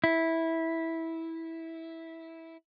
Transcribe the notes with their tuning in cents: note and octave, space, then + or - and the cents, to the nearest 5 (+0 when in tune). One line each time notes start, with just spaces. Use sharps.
E4 -15